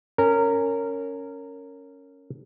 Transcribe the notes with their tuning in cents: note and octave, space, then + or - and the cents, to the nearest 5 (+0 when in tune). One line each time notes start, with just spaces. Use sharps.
C#4 +0 A#4 -20